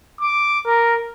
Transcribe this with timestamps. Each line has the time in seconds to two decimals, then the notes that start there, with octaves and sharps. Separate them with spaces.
0.21 D6
0.66 A#4